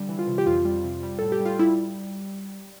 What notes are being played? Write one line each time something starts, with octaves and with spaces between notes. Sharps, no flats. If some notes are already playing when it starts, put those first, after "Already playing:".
Already playing: D3 G3
E3
F4
C3
G4
F2 F4
G3
C3
G3
A2 A4
G4
G3
F4
G3 E4